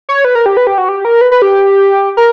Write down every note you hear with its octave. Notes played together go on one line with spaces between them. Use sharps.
C#5
B4
A#4
G4
B4
G4
F#4
G4
A#4
B4
B4
G4
A#4